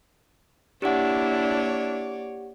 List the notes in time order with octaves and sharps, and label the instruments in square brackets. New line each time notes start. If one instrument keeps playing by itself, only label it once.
[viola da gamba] A#3 C#5 D5 [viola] D4 E4 [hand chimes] G4 F#5